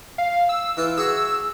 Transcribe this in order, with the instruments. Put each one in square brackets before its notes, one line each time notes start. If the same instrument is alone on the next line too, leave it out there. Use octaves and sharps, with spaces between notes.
[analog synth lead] F5
E6
[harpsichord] E3 F4
[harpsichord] F#4 G#4 [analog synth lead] E6